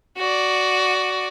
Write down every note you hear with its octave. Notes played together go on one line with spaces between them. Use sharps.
F#4 D5